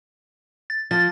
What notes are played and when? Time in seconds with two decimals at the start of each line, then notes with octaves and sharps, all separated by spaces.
0.70 A6
0.91 F3 A6